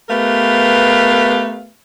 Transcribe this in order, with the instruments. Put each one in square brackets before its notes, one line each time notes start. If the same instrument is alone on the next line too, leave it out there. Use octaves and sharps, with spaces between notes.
[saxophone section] A3 B3 G4 A#4 B4 F5